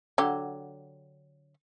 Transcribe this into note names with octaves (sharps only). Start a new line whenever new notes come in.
D3 F#3 G4